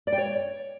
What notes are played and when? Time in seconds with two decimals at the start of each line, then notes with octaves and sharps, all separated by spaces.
0.07 D5
0.12 G5
0.18 C#5